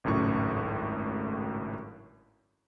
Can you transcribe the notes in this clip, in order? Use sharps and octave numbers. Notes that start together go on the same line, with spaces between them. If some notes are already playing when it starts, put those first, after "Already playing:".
G#1 C#2 F#2 A2 C#6